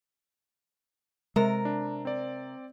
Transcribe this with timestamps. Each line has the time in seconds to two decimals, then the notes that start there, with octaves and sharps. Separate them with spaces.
1.36 C3 G#3 A#4
1.65 D4
2.05 C4 D5